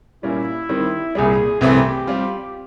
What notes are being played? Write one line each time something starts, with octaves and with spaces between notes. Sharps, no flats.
A#2 G3 A#3 C#4 E4
D#3 G3 C4
C2 A#2 G3 G#4
C2 C3 E3 A3 C4 G4
G3 C4 F4